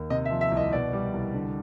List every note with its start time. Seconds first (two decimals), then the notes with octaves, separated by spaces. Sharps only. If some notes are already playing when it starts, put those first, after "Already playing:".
Already playing: D#2
0.10 C3 D#5
0.25 E5
0.31 F3
0.41 E5
0.51 C2
0.57 D#5
0.72 B2 D5
0.93 G3
1.14 C2
1.34 D3